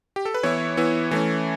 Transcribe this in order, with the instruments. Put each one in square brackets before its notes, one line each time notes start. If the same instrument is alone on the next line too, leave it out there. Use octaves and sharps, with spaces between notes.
[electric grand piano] G4
A4
B4
E3 B3 E4 C#5
E3 B3 E4
E3 A3 C#4